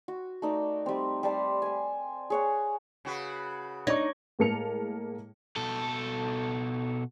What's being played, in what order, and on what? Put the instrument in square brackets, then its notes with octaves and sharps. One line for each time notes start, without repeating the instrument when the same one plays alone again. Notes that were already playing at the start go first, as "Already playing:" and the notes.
[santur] F#4
A3 D#4 D5
G3 C4
G3 D5 A5 C6
G#5 A5
G#4 C#5 F#5
[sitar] C#3 F#4 B4
[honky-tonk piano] D4 D5 A#6 [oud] D#4 [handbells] C#5 C#6
[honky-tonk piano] A2 G#3 A#3 A5 C#7 F7
[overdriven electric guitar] B2 A4